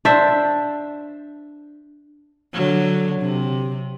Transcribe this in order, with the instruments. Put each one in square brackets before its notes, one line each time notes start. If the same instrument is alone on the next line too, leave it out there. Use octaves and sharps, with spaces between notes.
[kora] D4 C5 E5
[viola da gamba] D3 F#3
C3